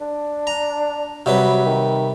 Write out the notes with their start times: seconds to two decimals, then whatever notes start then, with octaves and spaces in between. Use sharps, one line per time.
0.01 D4
0.47 A#5
1.26 C3 F#3 G3 B4
1.66 D#3